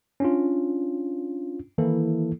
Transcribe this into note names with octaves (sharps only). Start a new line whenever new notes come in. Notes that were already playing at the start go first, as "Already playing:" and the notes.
C#4 D4 F4
D#3 E3 A#3 E4 A4